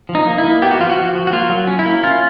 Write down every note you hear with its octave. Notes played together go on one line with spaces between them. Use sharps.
F3
D#4
A#3
E4
A#3
B3 G4
F#4
F3 F4
F#4
F3
F3
F#4
A#3 F4
F#3
C#4
E4
A#3
C#4 F4